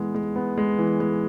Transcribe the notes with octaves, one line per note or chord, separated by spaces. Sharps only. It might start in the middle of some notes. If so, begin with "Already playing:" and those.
Already playing: E3 G#3 B3
G#3
B3
G#3
E3
G#3